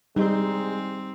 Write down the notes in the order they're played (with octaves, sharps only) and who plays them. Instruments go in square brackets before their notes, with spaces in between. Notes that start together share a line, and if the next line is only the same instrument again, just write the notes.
[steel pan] G3 [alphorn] G#3 [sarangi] C4 [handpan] D#4